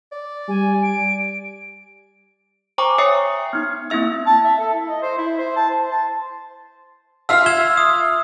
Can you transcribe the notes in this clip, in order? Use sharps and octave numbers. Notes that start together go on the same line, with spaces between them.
D5
G3 G#5
D7
C5 G5 G#5 A#5 C#6 D6
C#5 E5 G5 D#6 C7 C#7
B3 D#4
A#3 C4 E4 E5 E6
A5
E5
A4
E4
D#5
C5
E4
C5
A5
C5
A5
F4 E5 F5 E6 F6
G#6 E7 G7
D#6